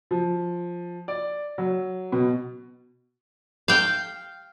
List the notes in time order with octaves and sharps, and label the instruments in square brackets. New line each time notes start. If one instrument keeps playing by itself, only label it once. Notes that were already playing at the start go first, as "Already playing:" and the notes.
[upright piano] F3
D5
F#3
B2
[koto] F5 G5